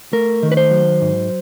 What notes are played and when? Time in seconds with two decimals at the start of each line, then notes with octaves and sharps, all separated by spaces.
0.13 A3 A#4
0.43 D#3
0.52 B4
0.57 C5
0.71 F#3
1.01 G#2